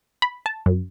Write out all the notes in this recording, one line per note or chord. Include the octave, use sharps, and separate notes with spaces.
B5
A5
F#2